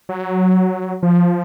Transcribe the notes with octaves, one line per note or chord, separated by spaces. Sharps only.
F#3
F3